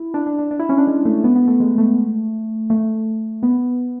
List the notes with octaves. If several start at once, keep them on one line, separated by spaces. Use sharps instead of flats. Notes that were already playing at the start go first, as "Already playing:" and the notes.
Already playing: E4
D4
D4
D4
D4
E4
C#4
D4
G#3
A3
B3
B3
A3
G#3
A3
A3
B3